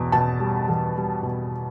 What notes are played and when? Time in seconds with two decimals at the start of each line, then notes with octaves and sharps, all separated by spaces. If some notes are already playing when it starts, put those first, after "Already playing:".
Already playing: E2 B2
0.12 B2 A5
0.40 G3
0.68 E2
0.96 G3
1.23 B2